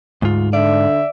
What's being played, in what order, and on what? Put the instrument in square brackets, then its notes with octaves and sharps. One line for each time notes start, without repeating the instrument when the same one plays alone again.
[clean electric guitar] D2 F4 [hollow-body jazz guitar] G#2
[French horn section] D3 [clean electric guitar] D5 [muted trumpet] E5